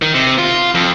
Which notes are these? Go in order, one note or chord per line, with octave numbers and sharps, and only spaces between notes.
D#3
C3
F4
F2